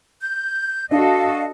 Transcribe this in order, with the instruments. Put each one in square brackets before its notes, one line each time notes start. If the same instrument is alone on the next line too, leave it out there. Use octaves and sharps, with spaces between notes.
[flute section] G6
[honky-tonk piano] D4 [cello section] F#4 A4 D#5 [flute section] F5